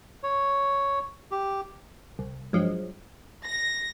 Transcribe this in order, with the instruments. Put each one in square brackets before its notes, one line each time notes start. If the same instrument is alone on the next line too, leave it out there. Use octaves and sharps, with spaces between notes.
[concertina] C#5
G4
[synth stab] C2
G2 F3 F#3 G#3
[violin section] A#6